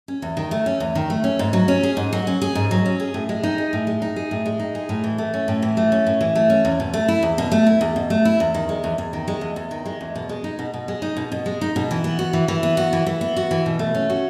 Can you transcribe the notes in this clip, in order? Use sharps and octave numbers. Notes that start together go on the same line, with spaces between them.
C#4
E2
D#3
A3
C#4
E2
D#3
A3
C#4
G#2
F#3
C#4
G#4
G#2
F#3
C#4
G#4
G#2
F#3
C#4
G#4
A2
G#3
D#4
G#4
A2
G#3
D#4
G#4
A2
G#3
D#4
G#4
A2
E3
A3
C#4
A2
E3
A3
C#4
A2
E3
A3
C#4
E2
B2
A3
E4
E2
B2
A3
E4
E2
B2
A3
E4
E2
D#3
G#3
E2
E2
D#3
G#3
E2
E2
D#3
G#3
E2
B2
G#3
D#4
B2
B2
G#3
D#4
B2
B2
G#3
D#4
B2
E3
B3
F#4
E3
E3
B3
F#4
E3
E3
B3
F#4
E3
B2
A3
C#4
F#4